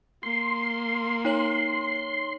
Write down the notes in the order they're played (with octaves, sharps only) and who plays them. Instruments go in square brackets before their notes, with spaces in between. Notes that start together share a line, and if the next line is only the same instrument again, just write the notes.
[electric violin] A#3 [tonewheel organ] C6
[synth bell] D#4 C#5 F#7